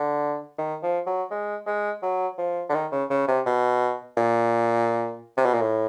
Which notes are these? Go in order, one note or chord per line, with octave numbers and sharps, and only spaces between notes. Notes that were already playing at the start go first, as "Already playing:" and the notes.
Already playing: D3
D#3
F3
F#3
G#3
G#3
F#3
F3
D3
D#3
C#3
C#3
C3
B2
A#2
C3
B2
A#2
A2